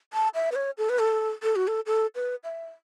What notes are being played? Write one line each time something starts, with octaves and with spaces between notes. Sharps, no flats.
A5
E5
B4
C#5
A4
B4
A4
A4
F#4
A4
A4
B4
E5